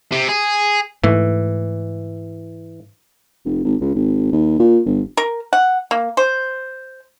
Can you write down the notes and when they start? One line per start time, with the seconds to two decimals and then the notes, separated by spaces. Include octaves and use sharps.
0.12 C3
0.29 G#4
1.04 G#2 E3 A3
3.45 F1
3.64 G#1
3.81 C#2
3.95 G#1
4.32 D#2
4.59 A#2
4.86 G1
5.17 A#4
5.53 F#5
5.91 A#3
6.17 C5